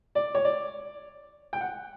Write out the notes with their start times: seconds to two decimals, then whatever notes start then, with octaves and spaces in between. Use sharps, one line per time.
0.15 D5
0.35 C#5
0.45 D5
1.53 G5
1.61 F#5